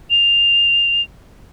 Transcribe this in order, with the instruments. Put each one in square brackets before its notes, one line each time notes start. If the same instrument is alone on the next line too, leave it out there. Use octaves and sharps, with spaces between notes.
[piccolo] F7